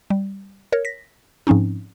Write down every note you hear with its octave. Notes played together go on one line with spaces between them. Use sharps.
G3
A#4 C#5
A#6 B6
G#2 F3 C4 C#4 D#4